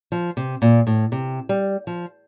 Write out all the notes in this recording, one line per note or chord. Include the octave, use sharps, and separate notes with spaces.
F3
C3
A#2
A2
C3
G3
F3